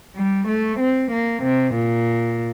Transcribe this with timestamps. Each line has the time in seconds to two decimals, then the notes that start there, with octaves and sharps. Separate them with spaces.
0.17 G3
0.48 A3
0.80 C4
1.12 A#3
1.43 C3
1.75 A#2